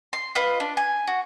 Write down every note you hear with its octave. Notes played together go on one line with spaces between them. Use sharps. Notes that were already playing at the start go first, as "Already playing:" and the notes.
C6
F4 B4 D#5
D4
G#5
F#4